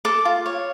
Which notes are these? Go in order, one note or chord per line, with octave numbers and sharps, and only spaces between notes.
A4 D6
F4
C#5